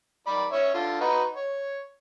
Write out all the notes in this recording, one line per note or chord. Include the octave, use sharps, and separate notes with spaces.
D#3 D5 B5
C#4 C#5 E5
D3 F4
D#4 F#4 B4
C#5